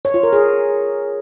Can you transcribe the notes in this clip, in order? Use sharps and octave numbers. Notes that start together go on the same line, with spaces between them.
C#5
F4
A#4
G#4